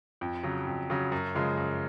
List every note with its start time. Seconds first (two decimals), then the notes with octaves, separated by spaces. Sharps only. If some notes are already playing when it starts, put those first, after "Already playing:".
0.21 F2
0.43 C#3 F#3
0.67 F2
0.90 C#3 F#3
1.12 F#2
1.35 C#3 F3 G#3
1.57 F#2